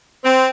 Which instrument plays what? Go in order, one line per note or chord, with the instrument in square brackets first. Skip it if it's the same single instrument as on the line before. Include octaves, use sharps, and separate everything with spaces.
[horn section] C4